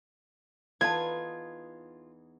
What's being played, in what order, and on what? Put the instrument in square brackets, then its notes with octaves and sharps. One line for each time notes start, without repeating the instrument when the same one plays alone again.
[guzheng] E2 D#4 B4 [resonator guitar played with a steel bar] F4 [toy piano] A4 D5 A5 [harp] G#6